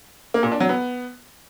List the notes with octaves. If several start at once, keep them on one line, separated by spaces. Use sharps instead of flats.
A#3
A#2
D4
F#3
B3